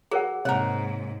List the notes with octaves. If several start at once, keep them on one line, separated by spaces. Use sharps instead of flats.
F#3 G#4 A#4 F#5
G#2 C3 A#3 A#4 C#5 F#5